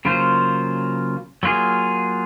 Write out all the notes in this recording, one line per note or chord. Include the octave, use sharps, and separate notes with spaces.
C#3 F#3 A#3 F4 C5
F#3 A#3 F4 G#4